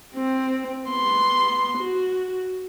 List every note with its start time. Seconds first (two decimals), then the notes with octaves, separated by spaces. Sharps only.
0.14 C4
0.86 B3 C6
1.78 F#4